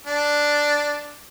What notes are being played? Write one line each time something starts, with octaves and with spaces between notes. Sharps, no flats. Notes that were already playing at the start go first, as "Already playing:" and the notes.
D4